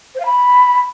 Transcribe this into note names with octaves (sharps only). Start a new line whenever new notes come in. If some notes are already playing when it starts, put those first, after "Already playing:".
C5
F5
B5